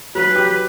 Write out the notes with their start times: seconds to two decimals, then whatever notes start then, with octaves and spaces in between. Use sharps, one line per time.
0.15 F#3 B4
0.36 G4